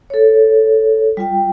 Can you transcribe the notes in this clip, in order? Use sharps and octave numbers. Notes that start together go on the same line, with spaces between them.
A4 C#5
G3 F4 G5